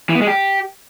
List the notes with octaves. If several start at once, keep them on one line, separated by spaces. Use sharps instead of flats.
E3
B3
G#3
G4